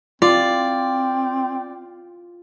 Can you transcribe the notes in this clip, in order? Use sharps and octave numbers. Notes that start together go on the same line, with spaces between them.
C4 F4 D5